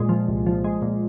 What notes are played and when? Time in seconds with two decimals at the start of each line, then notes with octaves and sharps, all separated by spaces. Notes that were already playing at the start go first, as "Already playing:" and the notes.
Already playing: A#2 G#3
0.09 F3
0.28 C2
0.46 F3
0.64 G#3
0.82 A#2